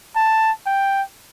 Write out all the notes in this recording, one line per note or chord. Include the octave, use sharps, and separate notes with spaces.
A5
G5